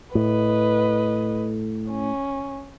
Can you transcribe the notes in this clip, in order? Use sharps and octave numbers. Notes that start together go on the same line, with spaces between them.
A2 B4 D#5
C#4